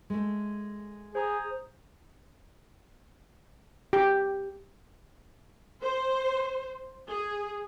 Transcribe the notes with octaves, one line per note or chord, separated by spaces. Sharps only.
G#3 A3
G#4 C5 A#5 D#6
G4
C5
G#4